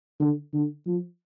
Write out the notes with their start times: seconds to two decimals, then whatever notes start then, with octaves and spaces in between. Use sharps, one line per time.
0.20 D3
0.53 D3
0.86 F3